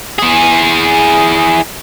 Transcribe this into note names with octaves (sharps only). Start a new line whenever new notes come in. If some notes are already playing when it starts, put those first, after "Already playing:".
E4 G#4